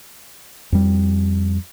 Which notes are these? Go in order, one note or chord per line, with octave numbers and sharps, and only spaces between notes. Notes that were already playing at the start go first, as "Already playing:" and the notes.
F2 G3